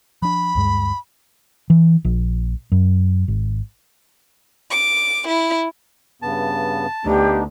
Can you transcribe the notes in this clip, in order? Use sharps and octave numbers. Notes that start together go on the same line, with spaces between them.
F3 D4 B5
D2 G2 G#3
E3
A#1
F#2
G#1
D6
E4
G2 C#3 B3 A5
D2 B3 D4 D#4 G4